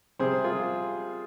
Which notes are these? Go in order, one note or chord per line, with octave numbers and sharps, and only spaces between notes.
C3 G3 C4 G#4 C5
F4 G#4